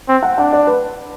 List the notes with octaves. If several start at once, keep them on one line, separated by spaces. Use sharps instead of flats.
C4
F#5
D4 F#5
D5
B4